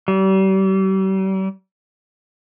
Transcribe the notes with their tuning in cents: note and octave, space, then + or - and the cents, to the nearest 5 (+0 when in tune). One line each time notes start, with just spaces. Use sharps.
G3 -40